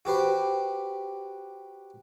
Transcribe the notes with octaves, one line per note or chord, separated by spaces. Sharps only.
F#4 G4 B4 C5